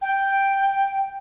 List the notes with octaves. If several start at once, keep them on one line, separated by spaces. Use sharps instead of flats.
G5